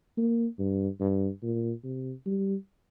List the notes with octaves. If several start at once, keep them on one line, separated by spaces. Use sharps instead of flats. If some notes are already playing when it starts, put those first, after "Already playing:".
A#3
G2
G2
A#2
C3
G3